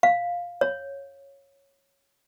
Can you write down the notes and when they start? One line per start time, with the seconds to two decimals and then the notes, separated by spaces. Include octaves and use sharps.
0.03 F5
0.61 C#5